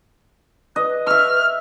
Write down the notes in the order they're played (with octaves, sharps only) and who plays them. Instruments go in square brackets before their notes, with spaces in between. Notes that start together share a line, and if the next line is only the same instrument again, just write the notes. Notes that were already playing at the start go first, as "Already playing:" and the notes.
[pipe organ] B4 [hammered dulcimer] D#5
[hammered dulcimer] E5 C#6 [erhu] F6